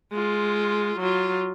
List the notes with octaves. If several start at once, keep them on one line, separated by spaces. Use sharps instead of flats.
G#3 F4
F#3 F4